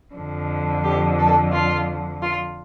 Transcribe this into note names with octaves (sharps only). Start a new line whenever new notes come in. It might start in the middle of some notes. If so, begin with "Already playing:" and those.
F2 D3 F3
G4
A4
F4
F4